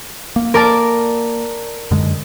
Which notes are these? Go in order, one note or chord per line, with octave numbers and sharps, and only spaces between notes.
A#3
A#4 D5 A5
F#2 D3 G#3